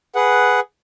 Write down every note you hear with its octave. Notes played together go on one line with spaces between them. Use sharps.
G#4 B4 F#5